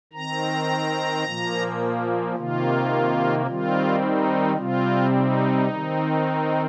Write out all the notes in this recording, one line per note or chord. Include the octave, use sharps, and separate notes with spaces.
D#3 C4 A#5
A#2 F3 A#3
C3 D#3 A#3 F4
D#3 G3 C4 F4
D#4
C3 G3 C4 F4
D#4
D#3 C4